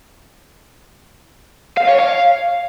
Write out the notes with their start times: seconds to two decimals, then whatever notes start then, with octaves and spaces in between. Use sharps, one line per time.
1.77 F5
1.89 C#5
2.00 F5